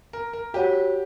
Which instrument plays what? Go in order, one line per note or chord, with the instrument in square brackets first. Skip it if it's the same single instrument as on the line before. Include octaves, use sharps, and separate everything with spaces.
[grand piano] A#4
A#4
[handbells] F#4 C#5 F#5 [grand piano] G4